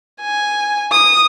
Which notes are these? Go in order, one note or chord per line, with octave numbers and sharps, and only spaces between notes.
G#5
D#6